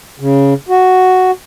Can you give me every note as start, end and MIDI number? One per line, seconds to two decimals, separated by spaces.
0.20 0.54 49
0.69 1.31 66